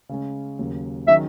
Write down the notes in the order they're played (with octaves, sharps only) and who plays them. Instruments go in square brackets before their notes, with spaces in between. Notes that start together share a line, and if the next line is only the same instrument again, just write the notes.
[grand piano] C#3 G#3 C#4
D#2 C#3 F#3
[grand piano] D#3 F#3 C#4 G#4 [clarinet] E5